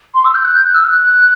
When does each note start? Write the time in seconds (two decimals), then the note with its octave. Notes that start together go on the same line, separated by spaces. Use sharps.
0.14 C6
0.25 E6
0.34 G6
0.44 F#6
0.55 G6
0.65 F#6
0.74 E6
0.85 F#6